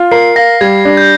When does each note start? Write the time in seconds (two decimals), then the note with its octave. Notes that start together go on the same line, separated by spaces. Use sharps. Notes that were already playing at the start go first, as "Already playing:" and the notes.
Already playing: F4
0.11 A#4 C7
0.36 F5 A#6
0.61 G3 G#6
0.85 D4
0.97 G6